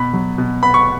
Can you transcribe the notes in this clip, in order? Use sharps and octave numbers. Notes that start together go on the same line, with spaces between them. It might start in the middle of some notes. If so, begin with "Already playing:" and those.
Already playing: B2 B5
F#3
B2
B3 B5
C#6